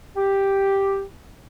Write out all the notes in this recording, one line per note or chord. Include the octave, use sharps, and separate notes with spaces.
G4